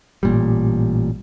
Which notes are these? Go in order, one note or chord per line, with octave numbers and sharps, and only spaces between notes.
A1 A#2 G3